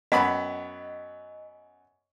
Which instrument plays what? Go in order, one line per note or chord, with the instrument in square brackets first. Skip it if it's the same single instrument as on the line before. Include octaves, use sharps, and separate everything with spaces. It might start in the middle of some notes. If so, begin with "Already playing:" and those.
[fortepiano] F#2 B3 B5 [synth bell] D#5